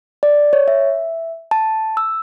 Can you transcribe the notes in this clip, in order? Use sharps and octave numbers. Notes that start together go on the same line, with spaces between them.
D5
C#5
E5
A5
E6